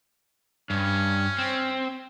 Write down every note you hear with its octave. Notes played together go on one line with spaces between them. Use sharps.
G2 C#4
C4